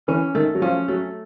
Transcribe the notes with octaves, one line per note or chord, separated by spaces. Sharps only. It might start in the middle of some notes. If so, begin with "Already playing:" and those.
E3 C#4
D#3 A3
F#3
F3 C#4
F#3 A3